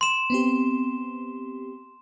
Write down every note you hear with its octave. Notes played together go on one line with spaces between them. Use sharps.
C6 E7
B3 C4 G4